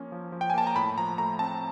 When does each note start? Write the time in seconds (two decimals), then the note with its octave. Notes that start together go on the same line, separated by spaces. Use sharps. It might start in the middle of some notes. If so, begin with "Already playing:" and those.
Already playing: F3 A#3 C#4
0.12 F3
0.32 F3
0.41 G5
0.50 G#5
0.54 A#3 A5
0.67 A#5
0.75 A2 B5
0.98 F3 A#5
1.18 A3 A#5
1.39 C4 A5